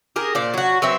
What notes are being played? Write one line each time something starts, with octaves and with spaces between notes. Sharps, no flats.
G4 G#4 A#4
A#2 C5 D5
F#3 F#4
F#3 B3 C4 E5